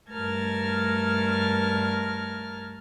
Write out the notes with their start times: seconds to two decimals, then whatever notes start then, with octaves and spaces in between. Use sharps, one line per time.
0.11 G2 A3 A#4 A5 F6 G#6